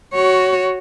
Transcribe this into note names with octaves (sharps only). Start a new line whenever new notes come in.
F#4 C#5